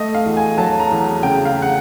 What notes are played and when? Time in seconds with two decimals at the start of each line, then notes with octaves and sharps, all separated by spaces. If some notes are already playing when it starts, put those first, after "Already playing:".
Already playing: A3 D#5
0.14 F5
0.26 E2
0.37 G#5
0.58 F#3 A5
0.80 A#5
0.91 E2
1.23 C#3 G5
1.45 F5
1.62 F#5